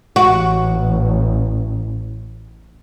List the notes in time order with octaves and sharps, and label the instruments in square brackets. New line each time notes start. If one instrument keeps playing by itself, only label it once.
[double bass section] A1 A2 [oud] F#4